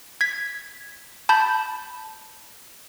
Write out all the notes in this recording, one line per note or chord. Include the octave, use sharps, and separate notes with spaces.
G#6 B6
A5 B5 G6